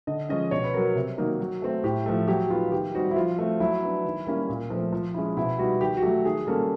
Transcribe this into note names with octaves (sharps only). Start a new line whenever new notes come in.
D3 D#5
F3 G#3 C#4 D#5
B2 C#5
B4
F#3 B3 A#4
C3
D#3 F#3 A#3 D#4
F#3
A3 C4
A2 G4
F3 A3
F#3 G4
B3 D#4 F4
D#3 G4
G3 C4 D#4 F#4
E4
F3 F4
A3 C4
F#3 E4
B3 D4
D#3
G3 A#3 C#4 E4
A#2
F3 A3 C4
F3
G#3 C#4 E4
B2 E4
G3 B3 D#4 F#4
D#3 G4
F#4
F#3 A3 G4
D#3 G#4
G3 A#3 C#4 A4